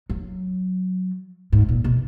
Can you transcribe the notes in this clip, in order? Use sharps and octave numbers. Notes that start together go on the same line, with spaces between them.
F#3
G#2
A#2
B2